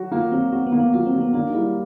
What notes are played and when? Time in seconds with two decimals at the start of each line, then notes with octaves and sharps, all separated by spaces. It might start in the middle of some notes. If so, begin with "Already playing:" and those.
Already playing: F#3 F#4
0.11 A#3 F4
0.32 F#3 C4
0.52 C4 F#4
0.66 B3
0.72 A#3
0.80 B3
0.93 F#3 F4
1.06 C4
1.13 F#3
1.21 B3
1.34 A#3 D4
1.50 D#4
1.54 G3 E4